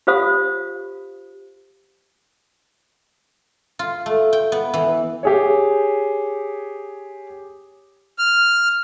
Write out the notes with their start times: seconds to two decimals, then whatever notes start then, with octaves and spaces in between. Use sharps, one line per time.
0.07 F4 G4 C5 F5 D#6
3.79 F4
4.06 A3
4.33 G5
4.52 B3
4.74 E3
5.23 G4 G#4 C#5
8.18 F6